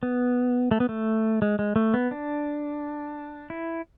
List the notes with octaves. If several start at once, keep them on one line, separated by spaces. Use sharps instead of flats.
B3
A3
B3
A3
G#3
G#3
A3
B3
D4
E4